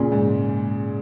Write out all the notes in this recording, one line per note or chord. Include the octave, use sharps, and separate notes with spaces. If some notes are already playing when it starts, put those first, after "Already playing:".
Already playing: A#2 C#3
G#2